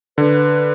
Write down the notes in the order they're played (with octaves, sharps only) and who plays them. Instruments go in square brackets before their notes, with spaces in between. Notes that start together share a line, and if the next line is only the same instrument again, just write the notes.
[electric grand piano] D3 [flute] B4